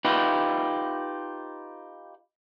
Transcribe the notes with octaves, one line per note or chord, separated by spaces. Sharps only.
D#4 F4 G4 B4